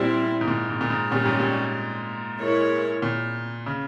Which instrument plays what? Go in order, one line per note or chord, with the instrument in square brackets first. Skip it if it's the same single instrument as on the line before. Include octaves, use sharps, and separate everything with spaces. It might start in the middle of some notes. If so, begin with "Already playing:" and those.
Already playing: [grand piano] A#2 [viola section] G3 C4 E4
[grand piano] G#2
A#2
G#2
A#2
G#2
[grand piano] A#2 [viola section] G3 C#4 G4
[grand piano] G#2
A#2
[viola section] G#3 E4 A#4 C#5
[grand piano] A#2
C#3